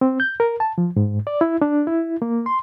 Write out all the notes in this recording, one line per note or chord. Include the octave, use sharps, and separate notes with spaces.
C4
G6
A#4
A5
F3
G#2
D5
E4
D4
E4
A#3
C6